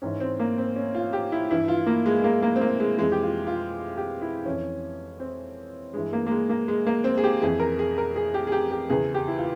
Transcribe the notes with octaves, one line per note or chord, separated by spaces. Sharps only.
G#2 E3 C#4
C4
A#3
C4
C#4
F4
G4
E4
G2 E3 E4
F4
A#3
G#3
G#3
A#3
A#3
C4
A#3
G#3
F2 E3 G#3
G4
F4
F4
G4
E4
F2 E3 C#4
C4
G2 E3 G#3
A#3
A#3
G#3
A#3
G#3
A#3
C4
G#4
G4
F2 E3 G#4
A#4
G#4
A#4
G#4
G4
G#4
G4
G4
E2 C#3 E3 G#4
G4
E4
F4